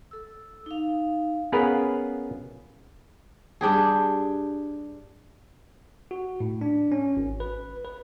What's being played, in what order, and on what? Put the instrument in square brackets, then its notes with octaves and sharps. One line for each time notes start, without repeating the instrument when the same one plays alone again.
[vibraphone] A4 E6
D#4 F5
[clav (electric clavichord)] B3 C#4 G#4 A#4 B4 F5
[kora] G2 D4 G4 G#4
[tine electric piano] F#4
A2
D4
C#4
G#1
B4
B4